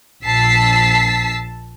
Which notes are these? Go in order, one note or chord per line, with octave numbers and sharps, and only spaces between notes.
A#1 A5 E6 B6 C7